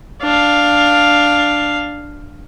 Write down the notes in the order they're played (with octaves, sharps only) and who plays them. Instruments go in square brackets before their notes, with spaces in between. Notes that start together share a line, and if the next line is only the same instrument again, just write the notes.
[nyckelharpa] D4 F5